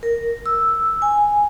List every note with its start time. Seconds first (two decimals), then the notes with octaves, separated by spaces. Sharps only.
0.03 A#4
0.46 E6
1.02 G#5